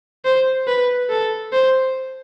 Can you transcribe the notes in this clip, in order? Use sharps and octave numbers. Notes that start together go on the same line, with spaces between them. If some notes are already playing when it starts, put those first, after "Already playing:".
C5
B4
A4
C5